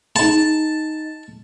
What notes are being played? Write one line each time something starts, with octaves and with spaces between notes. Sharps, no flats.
D#4 G#4 A5